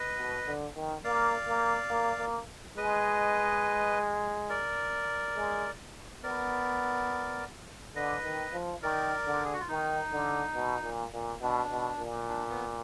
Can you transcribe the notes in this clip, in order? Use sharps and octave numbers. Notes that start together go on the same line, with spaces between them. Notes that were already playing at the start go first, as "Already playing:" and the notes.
Already playing: B4 D#5
B2
D3
D#3
A#3 D5 F5
A#3
A#3
A#3
G#3 B4 D#5
A#4 D5
G#3
B3 A#4 D5
D3 B4 D#5
D#3
F3
D#3 A#4 D5
D3
G#4
F#4
F4
D#3 D#4
D3
B2
A#2
A#2
B2 D4
B2
A#2
D4
B3